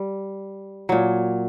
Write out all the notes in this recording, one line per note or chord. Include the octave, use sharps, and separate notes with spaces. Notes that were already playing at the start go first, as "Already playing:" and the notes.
Already playing: G3
A#2 F#3